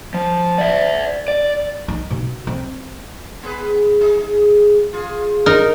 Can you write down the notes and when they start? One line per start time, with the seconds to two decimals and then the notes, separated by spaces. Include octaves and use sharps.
0.14 F3
0.58 D5 E5
1.28 D5
1.88 D#4
2.11 B2
2.47 C4
3.43 B3 G#4 B4
4.01 D#4 G#4
4.93 F4 G#4
5.46 D#4 A#4